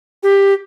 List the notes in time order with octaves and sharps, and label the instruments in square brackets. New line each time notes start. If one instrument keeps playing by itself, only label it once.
[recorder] G4